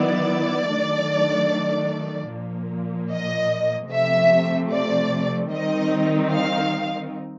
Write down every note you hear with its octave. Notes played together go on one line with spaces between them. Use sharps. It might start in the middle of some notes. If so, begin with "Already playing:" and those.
Already playing: D#3 F#3 B3 E4 D5
D#3 F#3 A3 D4
A#2 F3 A#3
D#5
C3 F3 A3 E5
D5
D#3 G3 C4 D#4 D#5
F5